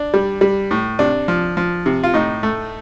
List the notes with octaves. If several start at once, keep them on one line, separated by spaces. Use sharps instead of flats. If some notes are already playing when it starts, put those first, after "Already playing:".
Already playing: D4
G3
G3
A2
C3 D4
F3
F3
C3
F4
A2 D#4
A3